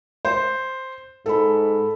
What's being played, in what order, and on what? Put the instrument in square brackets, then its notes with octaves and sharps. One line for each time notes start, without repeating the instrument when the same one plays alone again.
[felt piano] C5
[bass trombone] G#2 [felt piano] A4 B5